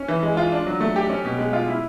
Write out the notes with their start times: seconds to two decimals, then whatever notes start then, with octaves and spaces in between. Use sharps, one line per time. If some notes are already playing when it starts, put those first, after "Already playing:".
Already playing: C#4
0.08 E3
0.23 G#3
0.37 F4
0.52 D4
0.67 F#3
0.80 A3
0.96 G4
1.10 C#4
1.25 B2
1.38 G#3
1.53 F4
1.68 E4